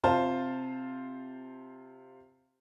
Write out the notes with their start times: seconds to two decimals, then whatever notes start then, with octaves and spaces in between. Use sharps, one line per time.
0.03 C3 F4 C5 F5 A5